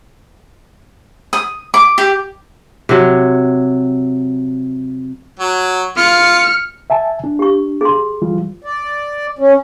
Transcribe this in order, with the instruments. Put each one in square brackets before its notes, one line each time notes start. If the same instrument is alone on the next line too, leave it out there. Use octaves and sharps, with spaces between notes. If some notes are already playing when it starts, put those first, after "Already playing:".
[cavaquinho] D#6
D6
G4
[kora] C3 F#3
[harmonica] F#3
[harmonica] F4 [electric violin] F6 C#7
[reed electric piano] E5 G#5 A5
D4
[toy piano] G4 C#6
G#4 C6
[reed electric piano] E3 G3 F4
[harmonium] D5
C#4